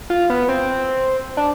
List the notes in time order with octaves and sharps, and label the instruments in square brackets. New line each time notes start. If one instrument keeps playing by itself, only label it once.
[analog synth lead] F4
B3
C4
D4